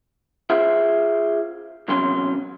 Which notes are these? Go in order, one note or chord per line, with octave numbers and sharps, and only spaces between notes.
F4 G#4 C5 E5
B1 E2 C3 F#3 C#4 C6